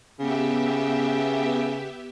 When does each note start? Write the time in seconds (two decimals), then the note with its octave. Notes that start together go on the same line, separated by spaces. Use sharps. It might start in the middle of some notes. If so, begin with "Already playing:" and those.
0.20 C#3 B3 G4 E5